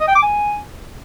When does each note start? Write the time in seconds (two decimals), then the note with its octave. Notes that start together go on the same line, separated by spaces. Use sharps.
0.01 D#5
0.08 G5
0.15 D6
0.23 G#5